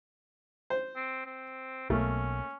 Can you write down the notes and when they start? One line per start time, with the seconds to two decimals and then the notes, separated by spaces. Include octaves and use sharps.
0.70 C5
0.96 C4
1.26 C4
1.90 B1 B2 A3 A#3 C#4